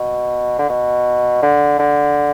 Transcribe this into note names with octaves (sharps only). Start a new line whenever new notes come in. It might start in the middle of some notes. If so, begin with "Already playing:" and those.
Already playing: B2
D3
B2
D3
D3